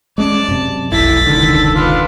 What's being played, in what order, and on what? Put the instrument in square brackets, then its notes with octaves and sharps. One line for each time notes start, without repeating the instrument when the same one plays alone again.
[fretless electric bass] G#3 C#4 [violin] D5 A5
[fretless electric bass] F#2 C3
[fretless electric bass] F1 B1 [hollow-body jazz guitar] E4 [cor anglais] A4 [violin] A6 B6
[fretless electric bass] E1 C#2 [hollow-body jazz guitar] D3 D#3
[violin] B3 D4 [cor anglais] F4